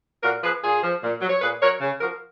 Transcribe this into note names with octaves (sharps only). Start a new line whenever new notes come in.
A#2 F#4 A#4
F3 G#4 B4
A#2 F4 G#4
F3
A#2
F#3
C#5
A#2 G#4 B4
F#3 A#4 C#5
C#3
F3 F#4 A#4